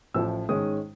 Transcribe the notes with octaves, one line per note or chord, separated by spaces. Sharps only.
A1 A2 F3 E6
G#2 D#3 G#3 C#4 D#6